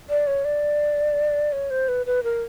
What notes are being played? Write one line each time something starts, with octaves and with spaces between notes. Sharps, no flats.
D5
C#5
D5
C#5
C5
B4
B4
A#4